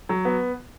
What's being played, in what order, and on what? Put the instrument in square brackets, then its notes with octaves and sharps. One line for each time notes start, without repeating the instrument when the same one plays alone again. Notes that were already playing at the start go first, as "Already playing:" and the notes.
[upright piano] F#3
B3